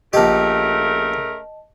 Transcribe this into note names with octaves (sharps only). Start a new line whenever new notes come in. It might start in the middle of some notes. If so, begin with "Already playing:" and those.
A#1 C#3 A3 G4 A#4 D#5 A5